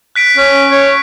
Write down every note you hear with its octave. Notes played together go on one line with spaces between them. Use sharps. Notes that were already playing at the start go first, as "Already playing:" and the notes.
F#6 B6 D7
C#4
C#5